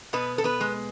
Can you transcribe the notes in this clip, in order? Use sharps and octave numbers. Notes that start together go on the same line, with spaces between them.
B2 B3 B4
A4
B3 B4
G#3